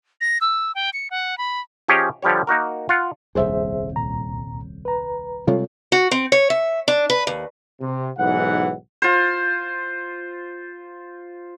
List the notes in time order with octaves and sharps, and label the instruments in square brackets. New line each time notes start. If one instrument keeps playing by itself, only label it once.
[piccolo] A#6
E6
G5
C#7
F#5
B5
[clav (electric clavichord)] F3 C#4 G4 G#4 C#5 D#5
D3 F3 G3 G4 C#5
A#3 D#4 F#4 A#4
F4 F#5
[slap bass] D#1 C2 F2 [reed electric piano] G#4 C5 E5
[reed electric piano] C#2 A#2 A#5
B4 A#5
[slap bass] C3 G3 G#3 [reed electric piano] F4 A4 C#5
[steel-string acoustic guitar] F#4
C4
C#5
E5
D4
B4
D#2
[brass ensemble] C3
B1 G#2 E3 F#5
[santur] F4 C5